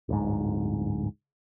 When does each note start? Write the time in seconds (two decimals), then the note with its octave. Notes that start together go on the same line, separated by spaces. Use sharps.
0.09 D1 G1 G#2